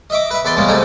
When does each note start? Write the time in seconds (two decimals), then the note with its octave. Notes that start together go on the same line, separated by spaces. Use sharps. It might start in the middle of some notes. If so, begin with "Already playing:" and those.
0.10 D#5 E5 D6
0.31 B4 E5
0.45 E2 B4 D5 C6
0.57 G#2 C#3 G3 G#3 A#3
0.68 C2 G#2 C3 A3 D#4